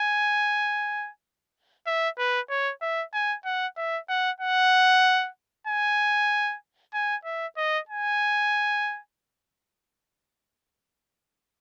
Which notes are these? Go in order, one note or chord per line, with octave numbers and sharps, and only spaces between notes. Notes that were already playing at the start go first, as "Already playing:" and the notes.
Already playing: G#5
E5
B4
C#5
E5
G#5
F#5
E5
F#5
F#5
G#5
G#5
E5
D#5
G#5